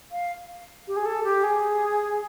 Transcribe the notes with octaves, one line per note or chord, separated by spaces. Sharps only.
F5
G4
G#4
A4
G4
G#4